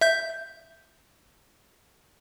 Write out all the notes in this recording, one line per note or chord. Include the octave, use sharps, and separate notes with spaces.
E5 G6